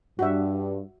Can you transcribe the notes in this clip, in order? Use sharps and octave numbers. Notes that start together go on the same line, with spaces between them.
G2 F#4 E5